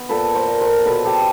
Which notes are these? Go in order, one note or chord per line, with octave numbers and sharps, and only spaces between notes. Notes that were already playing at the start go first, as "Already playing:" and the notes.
Already playing: B3
A#2 A4 B4
A#4 C5
A#2
A#4 C5
B2 A4 B4
G4 A4